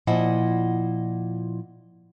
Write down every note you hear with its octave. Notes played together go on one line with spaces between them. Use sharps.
A#2 F3 E4 D#5 F#5